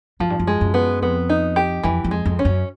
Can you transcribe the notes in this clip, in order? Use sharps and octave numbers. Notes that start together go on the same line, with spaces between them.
F#2 F3
G2
F#2
G#3
F#2
B3
F2 B3
D#4
G4
F2 E3
F2
G#3
F2
C#4
F#2